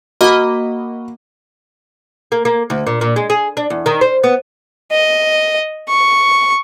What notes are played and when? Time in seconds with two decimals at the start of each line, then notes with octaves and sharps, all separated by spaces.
0.21 A#3 F#4 D#5 B5
2.32 A#3
2.45 A#3
2.70 D2
2.87 A#2
3.01 A#2
3.16 G#3
3.30 G#4
3.57 D4
3.70 E2
3.86 D#3
4.01 C5
4.24 B3
4.92 D#5
5.89 C#6